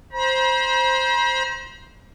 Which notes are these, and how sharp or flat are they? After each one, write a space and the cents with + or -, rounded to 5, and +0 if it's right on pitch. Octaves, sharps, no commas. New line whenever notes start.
C5 +0 A#5 +45